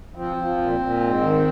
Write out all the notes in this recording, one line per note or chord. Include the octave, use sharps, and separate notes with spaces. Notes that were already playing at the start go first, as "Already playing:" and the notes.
F3 C4
F3
A#2
A#2
G#2
D#3